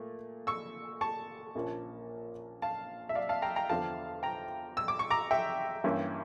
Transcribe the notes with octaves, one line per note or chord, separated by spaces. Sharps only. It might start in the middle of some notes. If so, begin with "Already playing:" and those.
Already playing: A#2 A3
C#6 E6
A5 C#6
A#1 A#2 F3 A#3 C#4
F5 A5
E5
D5 F5
F5 A5
G5 A#5
G5 A#5
E2 D3 F3 F5 A5
G5 A#5
E6
D6
C#6
A#5 D6
E5 G5
G2 E3 A#3 C#4